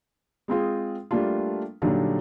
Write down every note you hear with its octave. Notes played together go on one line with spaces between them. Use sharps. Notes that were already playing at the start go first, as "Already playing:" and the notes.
G#3 C4 F4 G#4
G3 A3 A#3 D4 F4
A#2 D3 F#3 G3 D#4 A4